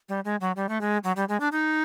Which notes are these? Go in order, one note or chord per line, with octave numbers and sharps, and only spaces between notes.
G3
G#3
F#3
G3
A3
G#3
F#3
G3
G#3
D4
D#4